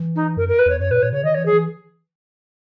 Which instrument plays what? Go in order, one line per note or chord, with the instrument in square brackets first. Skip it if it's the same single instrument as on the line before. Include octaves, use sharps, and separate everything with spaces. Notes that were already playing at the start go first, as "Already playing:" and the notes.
Already playing: [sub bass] E3
[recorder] D#4
[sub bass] F#2 [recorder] A#4
[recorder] A#4
B4
[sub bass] E2 [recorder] C#5
[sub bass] F#2 [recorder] C#5
[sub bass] A#2 [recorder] B4
[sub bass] A#2 [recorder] C#5
[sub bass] C#3 [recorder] C#5
[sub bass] D#3 [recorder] D#5
[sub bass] E3 [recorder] C#5
[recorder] G#4
[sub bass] E3